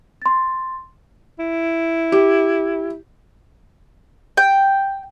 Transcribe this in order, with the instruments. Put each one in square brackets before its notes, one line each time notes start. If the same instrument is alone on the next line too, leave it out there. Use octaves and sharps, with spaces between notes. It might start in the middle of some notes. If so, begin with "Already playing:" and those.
[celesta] C6 A6
[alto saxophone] E4
[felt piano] G4
[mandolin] G5